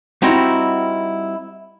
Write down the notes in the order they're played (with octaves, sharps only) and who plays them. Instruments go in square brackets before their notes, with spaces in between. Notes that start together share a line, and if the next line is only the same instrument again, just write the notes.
[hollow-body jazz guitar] G3 C4 D#4 E4 F#4